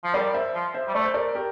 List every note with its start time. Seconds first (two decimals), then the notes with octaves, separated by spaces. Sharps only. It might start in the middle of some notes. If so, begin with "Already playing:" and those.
0.04 F3
0.14 G3 A#4 D5
0.34 C5 E5
0.54 F3
0.74 C5 E5
0.88 G3
0.94 A3 D5
1.04 C5
1.14 A#4 D5
1.35 G4 A#4